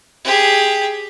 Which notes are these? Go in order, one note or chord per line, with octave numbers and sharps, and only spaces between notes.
G4 G#4